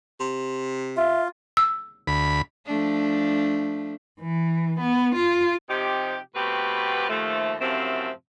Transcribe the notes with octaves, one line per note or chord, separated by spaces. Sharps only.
C3
F4 E5
E6
D2 B5
F3 A3 D4
E3
B3
F4
C3 F3 D#4 G4
B2 A3 B3 C4 G4 B4
D#2 F3 A3
F#2 A2 C3 F3 C4 E5